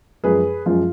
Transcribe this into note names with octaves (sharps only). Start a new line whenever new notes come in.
F#2 F3 G#3 G#4 B4
F#2 F3 G#3 F4